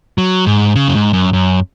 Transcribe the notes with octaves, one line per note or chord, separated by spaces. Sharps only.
F#3
G#2
C#3
F#2
G#2
F#2
F#2